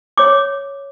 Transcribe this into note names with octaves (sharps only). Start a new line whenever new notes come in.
C#5 D6